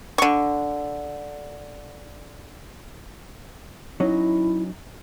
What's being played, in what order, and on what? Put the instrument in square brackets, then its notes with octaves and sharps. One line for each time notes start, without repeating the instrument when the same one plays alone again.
[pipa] D3 C#6
[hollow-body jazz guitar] F#3 C#4 D#4 [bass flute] E4